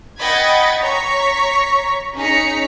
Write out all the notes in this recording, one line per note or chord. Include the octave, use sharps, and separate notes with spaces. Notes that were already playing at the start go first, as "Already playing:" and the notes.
D#5 F#5 G5 B5 G#6 A6
C#5 A#5 C#6 B6
C#4 D#4 G#4 A#5 B6 C#7